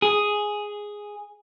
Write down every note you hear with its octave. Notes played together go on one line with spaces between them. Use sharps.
G#4